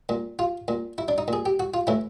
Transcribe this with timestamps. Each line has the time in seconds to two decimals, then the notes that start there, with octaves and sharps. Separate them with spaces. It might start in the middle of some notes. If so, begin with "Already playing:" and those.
0.09 A#2
0.39 F4
0.68 A#2
0.98 E4
1.08 D4
1.18 D#4
1.28 A#2 G#4
1.46 G4
1.60 F#4
1.74 F4
1.87 A2 E3 E4